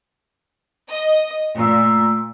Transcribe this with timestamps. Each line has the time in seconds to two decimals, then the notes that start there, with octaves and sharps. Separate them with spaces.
0.90 D#5
1.56 A#2 A3 A#5 E6